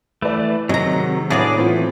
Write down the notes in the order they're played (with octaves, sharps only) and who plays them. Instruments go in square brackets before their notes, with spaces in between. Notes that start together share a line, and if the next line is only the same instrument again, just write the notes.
[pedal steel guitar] E3 A3 [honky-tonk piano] B4 D5
[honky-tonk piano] C3 [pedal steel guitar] D#3 F#3 [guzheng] G#3 A#5
[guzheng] A2 F#3 B3 [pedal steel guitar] D4 G#4 D5
[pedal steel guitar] E3 [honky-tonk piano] C4 F4